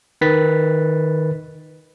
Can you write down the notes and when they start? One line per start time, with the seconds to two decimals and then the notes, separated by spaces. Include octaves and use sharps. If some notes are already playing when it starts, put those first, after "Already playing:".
0.21 D#3 B4 A6 B6